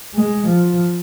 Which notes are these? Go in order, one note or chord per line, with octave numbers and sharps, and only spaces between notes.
G#3
F3